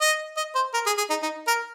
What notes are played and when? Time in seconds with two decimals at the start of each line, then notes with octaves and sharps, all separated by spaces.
0.01 D#5
0.37 D#5
0.55 C5
0.74 A#4
0.87 G#4
0.98 G#4
1.10 D#4
1.23 D#4
1.47 A#4